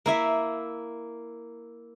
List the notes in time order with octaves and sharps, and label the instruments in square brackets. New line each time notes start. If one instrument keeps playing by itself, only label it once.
[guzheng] A#3 E4 E5